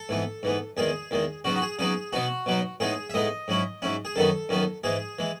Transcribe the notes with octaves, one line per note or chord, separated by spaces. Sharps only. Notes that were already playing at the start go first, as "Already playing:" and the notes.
Already playing: A4
G#2 E3 B3
G#2 E3 B3
E2 D#3 G#3 G#4
E2 D#3 G#3
C#3 F#3 B3 D#4 F#4
F#4
G#4
C#3 F#3 B3 D#4 G#4
B2 F#3 B3 D#4 F#4
B2 F#3 B3 D#4
A2 G#3 B3 D#4 G#4
E5
A2 G#3 B3 D#4 D#5
G#2 F#3 C#4 E4
G#2 F#3 C#4 E4
G#4
F#2 D#3 F#3 B3 D#4 A4
F#2 D#3 F#3 B3 D#4
G#2 E3 G#3 G#4
E3 G#3